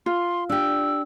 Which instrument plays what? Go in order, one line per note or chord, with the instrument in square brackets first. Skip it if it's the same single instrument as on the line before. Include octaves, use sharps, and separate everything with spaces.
[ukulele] F4 [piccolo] C6
[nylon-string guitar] D4 G4 [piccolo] E6